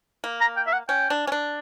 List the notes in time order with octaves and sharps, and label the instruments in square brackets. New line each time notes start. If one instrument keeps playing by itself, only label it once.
[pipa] A#3
[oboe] A#5
G5
E5
F#5
[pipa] C#4 [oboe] G5
[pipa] D4
C#4
D4